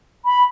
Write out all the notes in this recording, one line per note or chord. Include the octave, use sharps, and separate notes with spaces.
B5